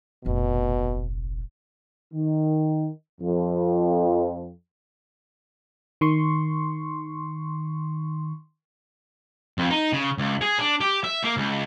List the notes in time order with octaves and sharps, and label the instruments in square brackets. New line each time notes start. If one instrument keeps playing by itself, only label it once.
[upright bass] F1 A#1 [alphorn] B2
[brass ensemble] D#3
F2
[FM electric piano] D#3 C6 C#6
[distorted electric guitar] F2
D#4
C#3
C#2
G#4
D4
G4
E5
A#3
C#2